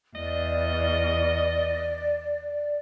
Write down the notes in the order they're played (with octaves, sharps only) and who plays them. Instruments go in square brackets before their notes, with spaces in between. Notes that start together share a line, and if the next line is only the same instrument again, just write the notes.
[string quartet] E2 [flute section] D5 [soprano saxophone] D#5